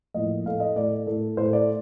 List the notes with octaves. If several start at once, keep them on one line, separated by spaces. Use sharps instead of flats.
A2 F3 A#3 D#5
A2 A3 F5
D#5
A2 A3 D5
A2 A3 A4
A2 A3 C5
D5